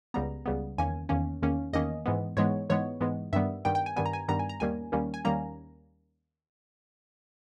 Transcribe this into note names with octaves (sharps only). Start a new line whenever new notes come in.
C#2 C#3 G3 B3 A#5
C#2 C#3 G3 B3
E2 D#3 A#3 C#4 G#5
E2 D#3 A#3 C#4
E2 D#3 A#3 C#4
E2 D#3 A#3 C#4 D#5
G#2 E3 G#3 B3
G#2 E3 G#3 B3 C#5
G#2 E3 G#3 B3 C#5
G#2 E3 G#3 B3
G2 D#3 G3 B3 E5
G2 D#3 G3 B3 G5
G5
G#5
G2 D#3 G3 B3 G#5
A#5
G#5
G2 D#3 G3 B3 A#5
G#5
A#5
D#2 D#3 G3 A#3 C#4 G#5
D#2 D#3 G3 A#3 C#4
G#5
D#2 D#3 G3 A#3 C#4 A#5